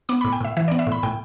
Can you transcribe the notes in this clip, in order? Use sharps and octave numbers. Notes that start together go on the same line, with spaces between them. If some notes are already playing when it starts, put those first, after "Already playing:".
B3 D6
B5
A2
G5
A2 E5
E3 E5
D5
B3
E5
A2
B5
A2 G5